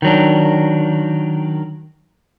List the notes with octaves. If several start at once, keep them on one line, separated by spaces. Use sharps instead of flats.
D#3 F#3 D4